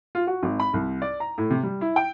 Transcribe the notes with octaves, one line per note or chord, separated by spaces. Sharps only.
F4
F#4
G#1
B5
C2
D5
A#5
A2
C3
G3
E4
G5